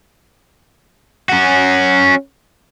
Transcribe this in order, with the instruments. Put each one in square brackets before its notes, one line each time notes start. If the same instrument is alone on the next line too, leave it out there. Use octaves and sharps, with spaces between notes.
[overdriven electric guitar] C#4 F#4